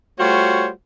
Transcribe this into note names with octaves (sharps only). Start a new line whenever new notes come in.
G3 A3 F4 F#4 C5 C#5